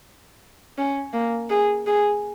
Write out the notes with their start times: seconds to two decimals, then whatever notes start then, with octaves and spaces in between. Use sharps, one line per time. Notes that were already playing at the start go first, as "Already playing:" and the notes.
0.78 C#4
1.13 A#3
1.50 G#4
1.87 G#4